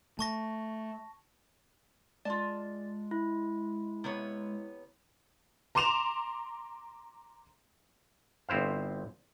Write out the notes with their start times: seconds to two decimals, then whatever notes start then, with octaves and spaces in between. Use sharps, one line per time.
0.19 A3 A5 C#6 A#6
2.25 G#3 F4 D5 A5
3.11 E4
4.04 C3 B3 C#5
5.75 A#5 C6 D6 E7 F7
8.49 G1 C4 E4 C5 F5